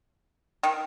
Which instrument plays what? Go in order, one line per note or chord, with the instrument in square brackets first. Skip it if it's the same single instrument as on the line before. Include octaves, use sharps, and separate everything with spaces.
[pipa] D#3